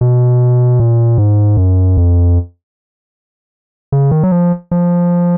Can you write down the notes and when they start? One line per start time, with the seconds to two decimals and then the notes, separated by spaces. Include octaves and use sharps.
0.01 B2
0.80 A#2
1.18 G#2
1.57 F#2
1.97 F2
3.92 C#3
4.11 D#3
4.23 F#3
4.32 F3
4.71 F3